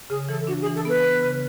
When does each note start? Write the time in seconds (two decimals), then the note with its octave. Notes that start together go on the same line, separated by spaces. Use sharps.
0.10 C#3 G#4
0.29 E3 A4
0.47 D4 F#4
0.61 G#4
0.66 E3
0.76 A4
0.85 B3 B4
1.03 B3
1.22 C#3